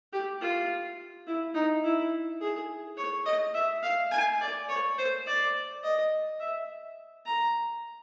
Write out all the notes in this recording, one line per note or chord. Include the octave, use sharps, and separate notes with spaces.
G4
F4
E4
D#4
E4
G#4
C#5
D#5
E5
F5
G#5
D5
C#5
C5
D5
D#5
E5
A#5